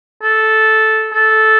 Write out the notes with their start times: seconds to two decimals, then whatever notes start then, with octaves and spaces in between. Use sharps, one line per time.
0.23 A4
1.13 A4